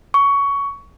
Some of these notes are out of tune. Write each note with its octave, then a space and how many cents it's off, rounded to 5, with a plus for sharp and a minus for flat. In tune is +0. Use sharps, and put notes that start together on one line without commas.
C#6 +15